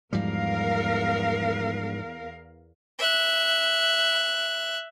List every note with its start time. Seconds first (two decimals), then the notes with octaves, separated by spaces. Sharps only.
0.13 E2 G#2 F3 G3 A#4 F5
2.99 E5 F#6